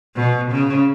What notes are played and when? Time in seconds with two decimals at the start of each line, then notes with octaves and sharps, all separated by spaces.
0.16 B2
0.52 C#3